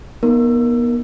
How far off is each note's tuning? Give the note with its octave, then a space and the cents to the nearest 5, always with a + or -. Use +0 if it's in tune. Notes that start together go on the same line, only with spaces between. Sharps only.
B3 -35 D#4 +0 A#4 +0